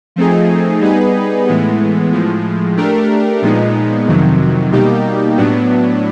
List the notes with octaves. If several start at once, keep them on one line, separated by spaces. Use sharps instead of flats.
F3 A3 C4 D#4 G#4
G3 B3 D#4 G#4 B4
A2 E3 G#3 B3
A2 F3 G#3
A3 D4 G4 A#4
A#2 F3 G#3 B3 D#4
F2 C3 D#3 F#3
B2 G3 A#3 D#4 G4
A2 F#3 B3 D4